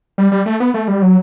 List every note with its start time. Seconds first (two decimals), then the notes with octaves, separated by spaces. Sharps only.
0.18 G3
0.32 G3
0.46 A3
0.60 B3
0.74 A3
0.88 G3
1.02 F#3